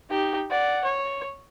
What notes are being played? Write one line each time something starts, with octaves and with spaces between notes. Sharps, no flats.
D#4 G4
D5 F#5
C#5